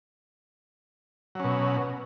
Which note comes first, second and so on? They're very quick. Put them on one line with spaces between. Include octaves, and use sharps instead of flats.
F#3 C#4 B2